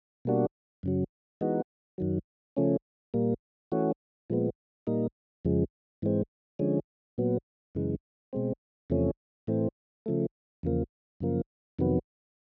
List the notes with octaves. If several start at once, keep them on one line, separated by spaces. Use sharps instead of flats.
B2 G3 A#3 D4 F#4
F#2 C#3 F#3
E3 G#3 B3 D#4 F#4
F#2 D#3 F#3
C#3 F3 A3 C#4
A#2 G3 A#3
E3 A3 C#4 F#4
A#2 F3 G#3 B3
A#2 G3 A#3 D#4
F2 C#3 F3 G#3
G#2 E3 G#3 C4
D3 F3 G#3 C#4
A#2 F#3 B3
F#2 C#3 E3 G#3
B2 G#3 C4
E2 C3 F3 A3 C#4
A2 E3 A3 C4
C#3 F3 A3
E2 C#3 F3 A#3
F#2 C#3 F3 A#3
F2 C3 D#3 F#3 B3